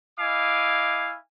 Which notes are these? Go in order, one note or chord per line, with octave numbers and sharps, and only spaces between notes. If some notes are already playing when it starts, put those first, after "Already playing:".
E4 D#5 F5 G#5 D6